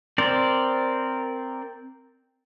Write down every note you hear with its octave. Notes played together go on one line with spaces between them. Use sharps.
C4 A#4 C5 D5